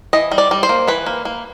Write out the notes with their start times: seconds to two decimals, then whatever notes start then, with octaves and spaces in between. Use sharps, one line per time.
0.13 E3 D#5
0.31 G3
0.38 D5
0.51 G3
0.63 C5
0.69 A#3
0.88 E3 B4
1.06 A#3
1.25 A#3